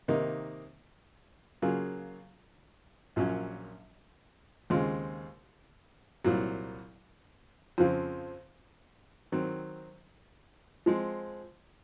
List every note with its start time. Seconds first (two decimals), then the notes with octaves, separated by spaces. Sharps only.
0.08 C3 D#3 A#3 D#4
1.62 C#3 F#3 A#3 F4 G#4
3.16 A#1 A#2 F#3 C#4
4.70 D#2 C#3 G#3 C4 F4
6.24 C2 A#2 F#3
7.78 F2 C#3 F3 C4
9.32 D#3 F#3 C4
10.86 F3 G#3 C4